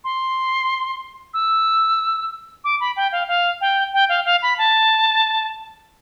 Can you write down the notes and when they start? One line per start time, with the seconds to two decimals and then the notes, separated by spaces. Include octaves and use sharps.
0.04 C6
1.34 E6
2.64 D6
2.80 B5
2.96 G5
3.12 F5
3.28 F5
3.61 G5
3.93 G5
4.09 F5
4.25 F5
4.42 B5
4.58 A5